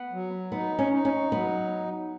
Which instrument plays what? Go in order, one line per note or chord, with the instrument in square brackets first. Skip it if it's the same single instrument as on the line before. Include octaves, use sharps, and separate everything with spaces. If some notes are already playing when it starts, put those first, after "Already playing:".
Already playing: [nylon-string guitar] B3
[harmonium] F#3
[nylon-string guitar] B3 [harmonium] D#4
[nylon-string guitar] C#4
[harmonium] D#4
[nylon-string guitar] C#4
[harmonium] F#3 [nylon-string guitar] B3